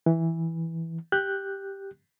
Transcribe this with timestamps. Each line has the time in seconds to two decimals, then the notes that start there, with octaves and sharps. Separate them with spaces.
0.06 E3
1.12 G4 F#6 G6